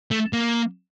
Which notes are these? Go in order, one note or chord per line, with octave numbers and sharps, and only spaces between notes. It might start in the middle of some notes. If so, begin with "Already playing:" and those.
A3
A#3